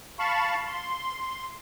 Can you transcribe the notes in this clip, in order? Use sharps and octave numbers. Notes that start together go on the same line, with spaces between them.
F5 A5 B5 C#6
C6